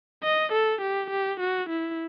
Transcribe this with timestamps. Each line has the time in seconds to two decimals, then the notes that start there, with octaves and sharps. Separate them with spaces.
0.23 D#5
0.53 A4
0.81 G4
1.10 G4
1.40 F#4
1.69 E4